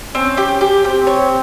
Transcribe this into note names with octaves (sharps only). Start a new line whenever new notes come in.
C4 C#4
G4
G4
C4 G4
C#5